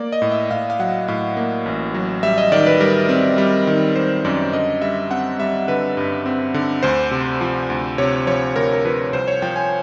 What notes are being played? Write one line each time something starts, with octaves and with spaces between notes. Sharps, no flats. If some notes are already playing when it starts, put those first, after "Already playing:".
Already playing: A#3 D5
D#5
A2
E5
A2 F5
F5
F#3 F#5
A2 F5
A#3
A1
F#3
G3 E5
D#5
D#3 D5
B4
G3 A#4
C4
G3
D#3
G3 C5
F#2 D5
D3 D#5
G3 E5
C4 F#5
G3 E5
D3 B4
G2
C4
D3
D2 C5
C3
F3
D2
C3 C#5
F3 C#5
D2 A#4
A#4
F3 B4
C2 C5
C#5
F3 G5
G#5